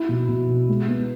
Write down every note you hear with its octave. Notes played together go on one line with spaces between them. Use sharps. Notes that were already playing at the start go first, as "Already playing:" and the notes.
Already playing: E4
B2
B2
B2
G#3
B3